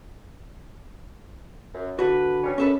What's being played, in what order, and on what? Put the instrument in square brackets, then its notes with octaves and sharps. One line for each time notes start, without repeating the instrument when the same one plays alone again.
[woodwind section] F#2
[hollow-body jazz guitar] D3 F#4 [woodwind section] B4
[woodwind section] G3 C#4
[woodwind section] F#2 [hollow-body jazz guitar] C#4 A4 B4